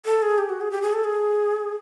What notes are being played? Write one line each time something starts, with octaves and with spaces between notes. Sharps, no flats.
A4
G#4
G4
F#4
G#4
G4
G#4
A4
G#4